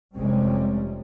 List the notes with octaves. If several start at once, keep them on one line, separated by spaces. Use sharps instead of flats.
F1 C3 G3 G#3 C4 C#4